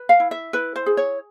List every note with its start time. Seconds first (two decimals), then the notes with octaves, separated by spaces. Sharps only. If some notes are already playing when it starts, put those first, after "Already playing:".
Already playing: B4
0.09 F5
0.20 E4
0.31 E5
0.53 E4 B4
0.76 C5
0.86 G#4
0.97 C#5